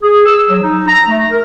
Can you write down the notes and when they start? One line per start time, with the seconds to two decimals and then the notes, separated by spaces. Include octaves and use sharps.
0.03 G#4
0.26 E6
0.49 F#3
0.62 D#4
0.87 A#5
1.09 A3
1.31 A#4